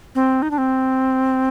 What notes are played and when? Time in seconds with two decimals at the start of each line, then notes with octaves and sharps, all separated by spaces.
0.15 C4
0.42 D#4
0.51 D4
0.58 C4